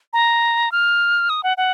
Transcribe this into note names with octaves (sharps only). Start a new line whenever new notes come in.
A#5
F6
D#6
F#5
F#5